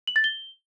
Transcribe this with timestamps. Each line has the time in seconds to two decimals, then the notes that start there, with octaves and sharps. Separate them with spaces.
0.07 F#7
0.16 A6
0.24 G7